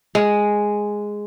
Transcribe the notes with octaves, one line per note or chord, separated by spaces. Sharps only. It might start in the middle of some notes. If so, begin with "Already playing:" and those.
G#3